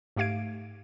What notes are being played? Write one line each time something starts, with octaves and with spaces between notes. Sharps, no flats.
G#2 A3 G4 F5 G#6 D7